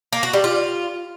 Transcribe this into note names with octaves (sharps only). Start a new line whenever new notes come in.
A#3
F#4
G3
F4